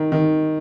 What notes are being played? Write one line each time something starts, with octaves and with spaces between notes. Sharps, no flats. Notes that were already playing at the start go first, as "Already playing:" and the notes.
Already playing: D#3
D#3